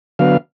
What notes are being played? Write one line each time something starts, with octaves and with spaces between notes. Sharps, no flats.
D3 F#3 B3 F5